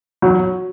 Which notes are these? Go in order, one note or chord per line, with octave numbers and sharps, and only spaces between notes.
F#3